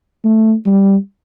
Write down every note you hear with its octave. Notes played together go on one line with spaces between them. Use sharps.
A3
G3